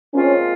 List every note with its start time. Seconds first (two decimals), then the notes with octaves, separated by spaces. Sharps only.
0.14 A#2 F3 G#3 C4 C#4 F4